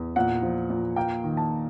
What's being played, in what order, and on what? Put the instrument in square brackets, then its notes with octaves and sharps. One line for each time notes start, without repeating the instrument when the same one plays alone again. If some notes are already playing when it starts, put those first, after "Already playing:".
Already playing: [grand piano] E2
[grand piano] A#2 [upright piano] F#5
[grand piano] F3
A#2
[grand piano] A#3 [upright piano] G5
[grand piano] D#3
[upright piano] A5